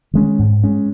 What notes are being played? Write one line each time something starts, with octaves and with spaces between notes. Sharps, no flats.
D#3 G#3 C#4
G#2
G#3 C#4